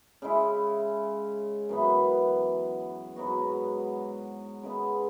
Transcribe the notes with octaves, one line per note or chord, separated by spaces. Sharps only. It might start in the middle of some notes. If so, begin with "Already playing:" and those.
C#3 G#3 E4
F#2 E3 B3
G#2 F#3 B3 F#4
C#3 G#3 B3